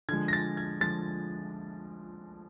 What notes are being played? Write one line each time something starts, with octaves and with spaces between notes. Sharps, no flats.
D3 F3 G#3 G#6
A#6
A6
G#6
D3 F3 G#3 A6